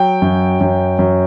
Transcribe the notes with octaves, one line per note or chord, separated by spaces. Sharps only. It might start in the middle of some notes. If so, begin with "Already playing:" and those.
Already playing: F#3 G5
F#2
F#2
F#2